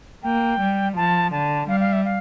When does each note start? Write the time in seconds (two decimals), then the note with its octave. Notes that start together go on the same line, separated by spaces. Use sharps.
0.23 A#3 G5
0.59 G3
0.96 F3 A5
1.32 D3 A5
1.68 G3 F5
1.80 F5
1.92 E5
2.05 F5